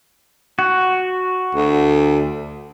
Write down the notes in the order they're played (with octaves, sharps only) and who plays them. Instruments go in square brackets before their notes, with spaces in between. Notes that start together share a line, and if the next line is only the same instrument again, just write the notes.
[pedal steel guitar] F#4
[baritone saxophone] D2